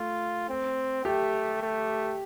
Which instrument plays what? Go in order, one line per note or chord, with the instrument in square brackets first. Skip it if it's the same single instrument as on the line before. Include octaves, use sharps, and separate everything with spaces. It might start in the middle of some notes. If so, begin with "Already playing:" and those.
Already playing: [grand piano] A3 [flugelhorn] F4
[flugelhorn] C4
[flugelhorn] A3 [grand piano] G4
[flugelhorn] A3